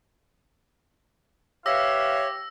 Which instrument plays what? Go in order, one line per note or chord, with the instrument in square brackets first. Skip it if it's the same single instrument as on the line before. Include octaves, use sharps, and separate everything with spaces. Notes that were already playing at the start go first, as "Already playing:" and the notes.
[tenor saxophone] G4 [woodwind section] B4 E5 F5 [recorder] C#5 [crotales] E6 A#6